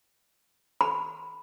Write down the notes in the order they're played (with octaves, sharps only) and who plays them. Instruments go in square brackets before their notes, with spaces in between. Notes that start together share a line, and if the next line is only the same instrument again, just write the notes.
[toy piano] B5